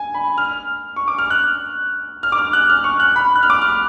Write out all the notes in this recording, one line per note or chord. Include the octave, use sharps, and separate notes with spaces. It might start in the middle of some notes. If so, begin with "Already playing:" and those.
Already playing: G#5
B5
F6
C#6
D6
F6
F#6
F6
D6
F6
F#6
F6
C#6
F#6
B5
F#6
F6
D6
F6